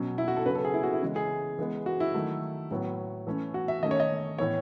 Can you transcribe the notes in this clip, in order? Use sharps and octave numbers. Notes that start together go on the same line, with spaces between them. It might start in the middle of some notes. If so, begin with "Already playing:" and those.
Already playing: B2 F#3 C#4
E4
F#4
A4
C#3 F#3 C#4 B4
A4
G#4
E4
F#4
E4
C#3 E3 G#3
G#4
E3 G#3 B3
F#4
E4
D#3 F#3 A3
A2 F#3 B3
E3 A3 C#4
F#4
E5
D#3 A3 C#4 D#5
C#5
D#5
A2 E3 B3 C#5